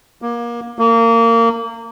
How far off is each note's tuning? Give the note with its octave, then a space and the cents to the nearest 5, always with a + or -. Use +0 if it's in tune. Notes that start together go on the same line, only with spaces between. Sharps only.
A#3 +25
A#3 -25